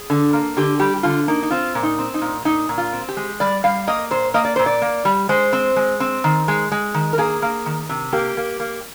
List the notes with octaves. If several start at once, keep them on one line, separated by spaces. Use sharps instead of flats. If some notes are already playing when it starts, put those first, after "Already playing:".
Already playing: G#4
D3
A#3
D3 G4
G3 G4
G4
D3 F4
A#3 D#4
D#4
C4 F4
A#2
D#4
C4
D#4
A#2
A#2 D#4
A#2
F4
C4
G4
G#3
G3 D5
G3 F5
A#3 D#5
A#2 C5
A#3 D#5
D5
A#2 C5
D5
A#3
G3
G#3 C5
C4
G#3
C4
D#3
G#3
G#3
D#3
A#4
A#3 G#4
A#3
D#3
C3
A#3 G4
A#3
A#3